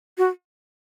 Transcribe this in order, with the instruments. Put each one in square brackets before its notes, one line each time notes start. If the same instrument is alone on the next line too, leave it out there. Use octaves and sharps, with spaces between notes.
[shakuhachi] F#4